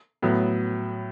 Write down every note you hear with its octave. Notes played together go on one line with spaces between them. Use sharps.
A2 F#3 B3